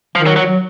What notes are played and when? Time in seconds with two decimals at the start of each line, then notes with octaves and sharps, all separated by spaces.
0.15 D#3 F3
0.26 F#3
0.36 F#3
0.47 F#3